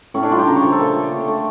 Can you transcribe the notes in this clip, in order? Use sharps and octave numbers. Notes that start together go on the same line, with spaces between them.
A2 C#4
D4
G3 F4
G4
C#3 A#4
C#5
F3 A3
A4
A#2 G4
A3
D3
A3